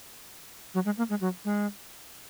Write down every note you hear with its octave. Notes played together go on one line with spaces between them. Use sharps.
F#3
G#3
A#3
G#3
F#3
G#3